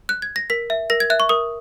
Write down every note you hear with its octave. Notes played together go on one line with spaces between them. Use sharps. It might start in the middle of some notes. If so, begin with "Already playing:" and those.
F#6
G#6
A#6
A#4 B6
E5
A#4 A#6
G#6
E5 F#6
C#6
A#4 D#6